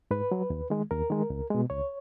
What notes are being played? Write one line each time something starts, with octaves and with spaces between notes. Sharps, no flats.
G#2 B4
F#3
D#2
D#3 G#3
D#2 A#4
D#3 G#3
C#2
B2 G#3
C#2 C#5